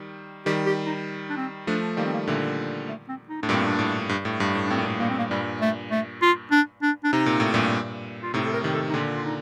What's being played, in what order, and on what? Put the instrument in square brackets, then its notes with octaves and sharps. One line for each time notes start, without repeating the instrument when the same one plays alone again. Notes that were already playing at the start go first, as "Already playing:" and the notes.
Already playing: [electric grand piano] D#3 G3
[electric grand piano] D#3 G3 [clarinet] G4
[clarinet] G4
D#4
D4
C4
[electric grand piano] F3 A3 [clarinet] D4
[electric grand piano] D#3 G3 [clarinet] A#3
[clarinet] C4
A#3
[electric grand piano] A#2 D3 [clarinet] A3
[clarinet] A3
C4
D#4
[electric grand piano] A2 [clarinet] D4
[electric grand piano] G2 A#2 [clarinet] C4
[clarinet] D4
[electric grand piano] A2
G2
A2
G2
A2
[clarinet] D4
[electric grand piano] A2 [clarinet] C4
[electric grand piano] A#2
A2
[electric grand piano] G2 A#2 [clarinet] A#3
[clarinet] C4
A#3
[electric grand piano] G2 A#2 [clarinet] G3
[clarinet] A3
A3
F4
D4
D4
D4
[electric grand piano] C3 [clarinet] D#4
[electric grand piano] A#2
A2
G2 A#2
[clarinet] F4
[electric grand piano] A2 C3 [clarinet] D#4
[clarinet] A4
A#4
[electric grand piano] C3 D#3
[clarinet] A4
D#4
[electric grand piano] A#2 D3 [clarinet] F4
[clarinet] F4
D#4